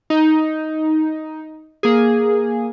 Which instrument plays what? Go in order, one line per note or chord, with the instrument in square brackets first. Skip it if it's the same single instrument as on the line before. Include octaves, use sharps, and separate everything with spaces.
[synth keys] D#4
A#3 G#4